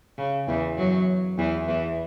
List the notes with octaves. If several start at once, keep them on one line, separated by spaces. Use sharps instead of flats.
C#3
E2 E3
F#2 F#3
E2 E3
E2 E3